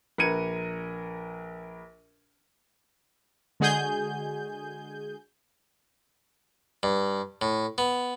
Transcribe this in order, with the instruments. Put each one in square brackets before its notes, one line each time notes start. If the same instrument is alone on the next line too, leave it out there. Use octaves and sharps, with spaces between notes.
[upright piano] A#1 A#4 B4 G#6 C#7 D#7
[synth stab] D3 G#3 F#4 G#4 G#5 G6
[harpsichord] G2
A2
B3